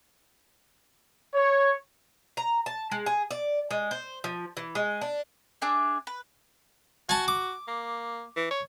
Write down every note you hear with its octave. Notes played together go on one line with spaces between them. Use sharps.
C#5
A#5
A5
G#3
G#4
D5
G#3
C5
F3
E3
G#3
D4
D4 G#4 E5
B4
F#4 G#5 A5
D6
A#3
E3
C#5